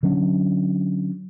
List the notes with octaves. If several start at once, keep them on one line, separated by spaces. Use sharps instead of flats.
D3 F#3 C#4 D4